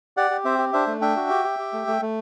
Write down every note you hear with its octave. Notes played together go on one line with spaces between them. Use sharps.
G4 D5 F#5
G4
C4 C5 E5
G4
D4 C5 E5
A3
D4 E5 G5
F#4
G4
G4
G4
A3
A3
A3